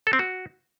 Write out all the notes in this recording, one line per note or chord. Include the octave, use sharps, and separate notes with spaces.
A4
C4
F#4